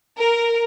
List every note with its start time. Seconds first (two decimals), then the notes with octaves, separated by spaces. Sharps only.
0.18 A#4